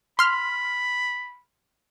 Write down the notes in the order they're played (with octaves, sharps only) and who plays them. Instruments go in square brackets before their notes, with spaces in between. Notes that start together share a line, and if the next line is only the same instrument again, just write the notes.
[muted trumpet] B5 [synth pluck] C6 F6